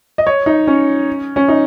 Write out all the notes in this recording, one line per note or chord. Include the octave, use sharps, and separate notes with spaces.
D#5
C#5
D#4
C#4
C#4
D#4